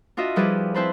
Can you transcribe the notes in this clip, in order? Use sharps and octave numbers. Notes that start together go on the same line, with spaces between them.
D4 F4 F#4 D#5 E5
F3 G3 E4 G#4 B4 D5
C4 E4 B4 C5 A5 B5